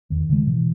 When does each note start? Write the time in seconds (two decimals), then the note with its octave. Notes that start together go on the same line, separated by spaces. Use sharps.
0.10 E2 D#3
0.29 C#3 G#3
0.47 B2 E3